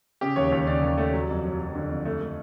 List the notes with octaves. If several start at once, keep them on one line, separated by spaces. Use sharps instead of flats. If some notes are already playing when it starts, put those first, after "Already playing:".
C#3 G4
D#2 C#5
D#2 C#5
C#3 D5
D#2
A3
F#3
F2
F#3
F#3
D3
F2
A3
A3